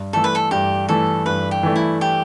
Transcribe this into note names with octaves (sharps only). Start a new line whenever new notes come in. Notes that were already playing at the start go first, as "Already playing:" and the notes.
Already playing: G2
E3 A3 A4
B4
A4
G2 G4
E3 A3 A4
G2 B4
G4
E3 A3
E4
G4